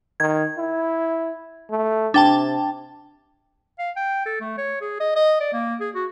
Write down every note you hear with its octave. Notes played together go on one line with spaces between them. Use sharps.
D#3 G#6
E4
A3
C3 D4 G5 A5
F5
G5
A4
A3
C#5
G#4
D#5
D#5
D5
A#3
G#4
F#4